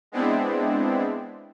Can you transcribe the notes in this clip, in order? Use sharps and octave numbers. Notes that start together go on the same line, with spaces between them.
G#3 B3 C4 D4 E4